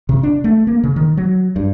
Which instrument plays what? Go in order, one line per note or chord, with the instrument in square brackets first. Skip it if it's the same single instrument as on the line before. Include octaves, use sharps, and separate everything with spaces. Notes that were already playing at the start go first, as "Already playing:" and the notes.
[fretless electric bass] C3
D4
A3
A#3
C#3
D#3
F#3
G2